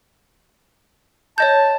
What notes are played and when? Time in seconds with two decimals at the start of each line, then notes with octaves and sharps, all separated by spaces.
1.38 C#5 D#5 A5 G6